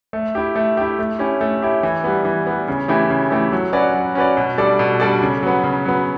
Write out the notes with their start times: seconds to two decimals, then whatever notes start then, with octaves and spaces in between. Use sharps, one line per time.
0.13 A3
0.35 E4 G4
0.56 A3
0.77 E4 G4
0.99 A3
1.19 C#4 E4 G4
1.41 A3
1.62 C#4 E4 G4
1.83 E3
2.04 G3 B3
2.25 E3
2.47 G3 B3
2.68 C#3
2.88 E3 A3 E4 G4
3.10 C#3
3.30 E3 A3 E4 G4
3.52 F#3
3.73 C#4 F#4 B4 D5
3.94 F#3
4.15 C#4 F#4 B4 D5
4.37 B2
4.58 G3 D4 A4 D5
4.79 B2
5.00 G3 D4 A4 D5
5.22 C#3
5.43 F#3 B3
5.64 C#3
5.85 F#3 B3